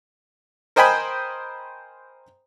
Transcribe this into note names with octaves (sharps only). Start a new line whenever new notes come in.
A#4 C5 D#5 G5 G#5 B5